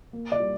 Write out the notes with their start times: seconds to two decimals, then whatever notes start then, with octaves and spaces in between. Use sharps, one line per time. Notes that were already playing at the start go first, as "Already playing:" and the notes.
0.13 A#3
0.32 D5
0.40 G3